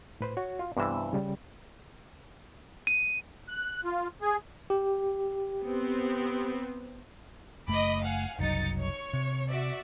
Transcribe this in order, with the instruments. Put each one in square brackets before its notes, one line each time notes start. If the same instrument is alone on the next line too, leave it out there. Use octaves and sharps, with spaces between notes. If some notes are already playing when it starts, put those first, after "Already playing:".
[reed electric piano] A2 B4 C5
[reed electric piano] F#4 [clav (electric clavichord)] C#5
[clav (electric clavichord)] F4
[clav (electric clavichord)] G2 C3 E3 [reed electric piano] B3 E6
[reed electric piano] C#3 G3
[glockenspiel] D#7
[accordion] F#6
F4
G#4
[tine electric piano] G4
[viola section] B3 C4
[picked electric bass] F#1 A3 [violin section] D#5 B5 D6
[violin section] F5 F#5 G#5
[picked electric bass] F#1 C2 F#3 [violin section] D#4 A6 C#7
[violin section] C#5 C#6
[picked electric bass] C3
[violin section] F#4 D5 E5